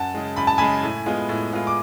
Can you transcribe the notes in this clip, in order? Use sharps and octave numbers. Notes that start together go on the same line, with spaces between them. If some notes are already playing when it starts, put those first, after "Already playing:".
Already playing: F#2 F#5 A5
C#3 G#3
F#2 B5
A5
C#3 G#3 G#5 B5
A2
G#3 B3 F4
A2
G#3 B3 F4
D6